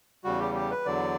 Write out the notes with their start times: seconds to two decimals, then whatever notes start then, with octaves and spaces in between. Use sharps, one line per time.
0.24 E2 C#3 G3 F#4
0.40 G4
0.55 G4
0.71 B4
0.86 E2 D3 F#3 D5